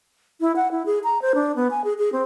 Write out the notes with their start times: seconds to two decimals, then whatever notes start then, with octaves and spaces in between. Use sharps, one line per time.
0.41 E4
0.56 F#5
0.72 E4
0.86 G#4
1.04 A#5
1.22 C5
1.35 D4
1.56 B3
1.71 G#5
1.84 G#4
1.98 G#4
2.13 C4